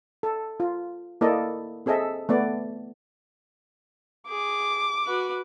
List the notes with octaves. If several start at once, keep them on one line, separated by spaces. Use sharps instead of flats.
A4
F4
A#3 E4 A4 D5 D#5
C4 G#4 A4 D#5 E5
A3 B3 D5
G#4 D6
F#4 B4